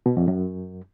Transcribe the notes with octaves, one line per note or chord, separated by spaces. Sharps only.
B2
F2
F#2